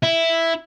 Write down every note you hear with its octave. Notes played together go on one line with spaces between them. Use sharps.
E4